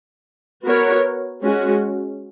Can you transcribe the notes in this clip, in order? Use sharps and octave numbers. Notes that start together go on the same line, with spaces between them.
B3 F#4 A#4 C#5
G#3 C#4 F#4